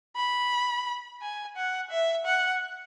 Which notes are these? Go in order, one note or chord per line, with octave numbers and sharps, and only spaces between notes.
B5
G#5
F#5
E5
F#5